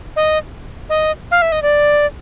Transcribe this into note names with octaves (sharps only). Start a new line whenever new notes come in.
D#5
D#5
F5
E5
D#5
D5